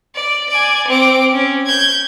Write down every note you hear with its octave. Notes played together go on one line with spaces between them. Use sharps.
D5
D5 G#5
C4 D6
C#4
G6 G#6